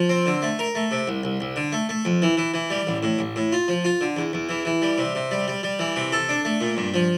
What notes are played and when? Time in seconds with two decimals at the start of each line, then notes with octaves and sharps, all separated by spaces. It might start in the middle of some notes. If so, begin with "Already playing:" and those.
Already playing: F3
0.10 C4
0.26 D3
0.42 A3
0.59 A#4
0.75 A3
0.91 C3
1.08 C2
1.24 C2
1.41 C2
1.56 D3
1.72 A3
1.89 A3
2.05 F2
2.22 E3
2.37 E3
2.54 E3
2.70 G3
2.87 A1
3.03 A2
3.19 A1
3.36 A2
3.52 F4
3.68 F3
3.85 F4
4.01 D3
4.17 E2
4.33 E2
4.49 E3
4.65 E3
4.82 G3
4.98 C3
5.15 C3
5.31 G3
5.48 G3
5.63 G3
5.79 E3
5.96 C3
6.12 A4
6.29 D4
6.45 A3
6.61 A#2
6.77 G2
6.94 F3